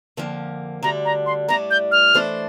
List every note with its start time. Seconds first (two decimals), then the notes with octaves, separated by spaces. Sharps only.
0.17 F2 D3 F3 A#3
0.83 D2 D3 G3 D4 A#5
1.05 A#5
1.26 C6
1.49 A2 G3 D4 A#5
1.71 G6
1.92 F6
2.14 E3 A3 D4 A4 C5